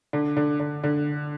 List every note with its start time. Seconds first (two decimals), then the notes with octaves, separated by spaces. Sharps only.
0.13 D3
0.37 D3
0.60 D3
0.84 D3